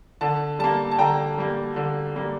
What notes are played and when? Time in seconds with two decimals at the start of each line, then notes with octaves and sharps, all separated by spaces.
0.21 D3 A5
0.59 G3 A#3 A5
0.91 A5
0.99 D3 G5 A#5
1.38 G3 A#3
1.76 D3
2.16 G3 A#3